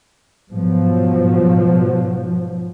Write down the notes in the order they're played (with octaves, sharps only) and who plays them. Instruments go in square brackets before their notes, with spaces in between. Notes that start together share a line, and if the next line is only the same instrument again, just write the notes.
[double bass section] G#2 B2 F3 F#3